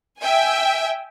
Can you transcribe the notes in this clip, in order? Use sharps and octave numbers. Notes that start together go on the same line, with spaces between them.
E5 G5 G#5